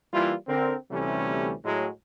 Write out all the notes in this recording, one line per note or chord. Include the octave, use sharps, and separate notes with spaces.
E3 G3 A#3 E4 F4
D3 C4 A#4
D2 C3 E3 G3 A3 C#4
A2 F#3 G#3